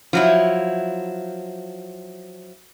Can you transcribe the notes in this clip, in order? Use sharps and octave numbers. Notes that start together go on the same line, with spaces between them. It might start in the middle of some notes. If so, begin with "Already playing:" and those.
F3 F#3 E4